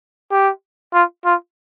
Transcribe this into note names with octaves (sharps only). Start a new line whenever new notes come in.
G4
F4
F4